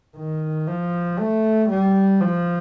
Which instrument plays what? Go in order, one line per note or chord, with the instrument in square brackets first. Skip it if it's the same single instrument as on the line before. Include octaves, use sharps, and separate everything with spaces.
[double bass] D#3
F3
A3
G3
F3